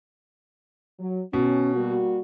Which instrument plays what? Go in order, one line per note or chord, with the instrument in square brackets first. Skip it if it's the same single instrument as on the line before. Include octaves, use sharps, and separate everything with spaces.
[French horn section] F#3
[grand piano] B2 [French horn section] C#4
[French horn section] G3 A#3 F#4